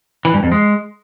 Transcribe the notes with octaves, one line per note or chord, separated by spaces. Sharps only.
E3
G2
F2
G#3